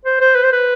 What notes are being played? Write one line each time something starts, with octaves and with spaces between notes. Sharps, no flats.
C5
C5
B4
C5
B4